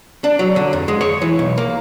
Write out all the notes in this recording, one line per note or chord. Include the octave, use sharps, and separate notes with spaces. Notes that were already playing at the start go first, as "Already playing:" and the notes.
D4
F#3
D3
F2
G#3
C#5
E3
B1
A#3